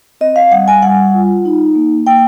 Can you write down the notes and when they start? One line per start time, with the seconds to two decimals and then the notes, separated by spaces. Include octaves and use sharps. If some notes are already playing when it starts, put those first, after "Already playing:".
0.21 C4 D#5
0.36 F5
0.51 G3 F#5
0.68 G#5
0.83 G3 F#5
1.14 F4
1.45 D#4
1.75 A#3
2.07 A#3 G5